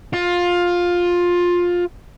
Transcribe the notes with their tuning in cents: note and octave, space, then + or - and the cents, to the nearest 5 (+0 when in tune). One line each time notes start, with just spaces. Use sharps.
F4 +15